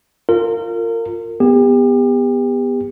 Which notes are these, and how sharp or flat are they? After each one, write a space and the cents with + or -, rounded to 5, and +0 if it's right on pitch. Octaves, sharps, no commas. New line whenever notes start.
F4 +0 A#4 -30
B3 +0 G4 +35